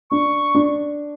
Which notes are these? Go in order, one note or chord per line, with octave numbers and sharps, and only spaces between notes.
D4 C#6
D4